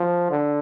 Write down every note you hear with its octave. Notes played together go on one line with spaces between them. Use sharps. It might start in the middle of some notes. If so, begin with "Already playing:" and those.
Already playing: F3
D3